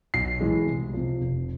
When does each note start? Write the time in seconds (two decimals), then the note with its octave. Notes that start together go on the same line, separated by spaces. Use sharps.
0.14 B1 C7
0.41 A2 E3 G#3
0.66 C2
0.93 C3 F3
1.21 F1